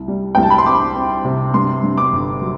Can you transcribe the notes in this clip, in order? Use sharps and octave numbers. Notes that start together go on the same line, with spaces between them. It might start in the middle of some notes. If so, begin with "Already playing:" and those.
Already playing: C2
G3
C2 G5
A5
B5
C6
C4 D6
C4
C3
G2 C6
G2
D6
G1
F#3